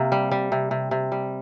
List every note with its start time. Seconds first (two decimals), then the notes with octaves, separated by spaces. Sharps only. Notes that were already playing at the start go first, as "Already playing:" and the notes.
Already playing: C3 A#3
0.12 G3
0.31 G3
0.52 C3
0.71 C3
0.91 C3
1.12 G3